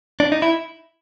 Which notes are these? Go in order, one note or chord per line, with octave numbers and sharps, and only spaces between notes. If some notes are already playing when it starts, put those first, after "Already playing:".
D4
D#4
E4